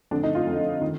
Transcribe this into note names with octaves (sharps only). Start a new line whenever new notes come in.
F2 D3 D4
D#4
F4
F2 D3
D#3